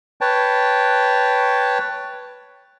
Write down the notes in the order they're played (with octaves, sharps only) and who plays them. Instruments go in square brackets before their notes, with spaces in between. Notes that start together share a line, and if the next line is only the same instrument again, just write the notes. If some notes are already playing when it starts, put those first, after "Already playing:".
[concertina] B4 C#5 G5 A5